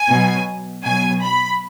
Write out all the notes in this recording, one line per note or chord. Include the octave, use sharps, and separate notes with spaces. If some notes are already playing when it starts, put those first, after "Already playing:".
Already playing: G#5
B2 F#3
B2 F#3 G#5
B5